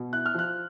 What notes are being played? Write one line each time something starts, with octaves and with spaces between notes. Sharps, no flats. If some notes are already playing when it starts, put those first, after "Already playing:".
Already playing: B2
E4 F#6
F6
F3 F#6